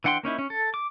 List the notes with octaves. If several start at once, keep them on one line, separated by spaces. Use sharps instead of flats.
E3 D4 F#5 G5 C6
A#3 C#4 D#4 E4
C#4
A4
D6